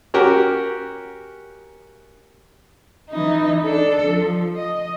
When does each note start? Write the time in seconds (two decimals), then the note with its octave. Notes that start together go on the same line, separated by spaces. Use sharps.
0.14 C#4 F#4 G4 A#4
3.10 E3 D#4
3.65 D4 A4
4.07 F3
4.56 D#5